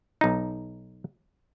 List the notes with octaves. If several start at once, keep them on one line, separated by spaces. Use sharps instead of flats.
B1 D#4